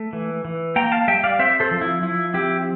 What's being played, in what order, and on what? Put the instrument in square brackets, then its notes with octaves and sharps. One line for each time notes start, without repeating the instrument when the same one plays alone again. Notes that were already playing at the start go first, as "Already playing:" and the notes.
Already playing: [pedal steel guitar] A3
E3
E3
A#3 G5 A#5
F5 A5
G3 E5 G5
D5 F5
C4 C5 E5
A4 C5
F3
E4
F3 E4
C4 E4 G4